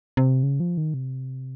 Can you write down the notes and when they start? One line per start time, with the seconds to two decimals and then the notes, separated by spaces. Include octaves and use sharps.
0.17 C3
0.43 C#3
0.60 F3
0.77 D#3
0.94 C3